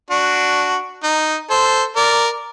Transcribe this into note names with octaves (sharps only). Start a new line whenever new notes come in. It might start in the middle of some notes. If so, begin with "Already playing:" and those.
D4 F#4
D#4
A4 C5
A#4 D5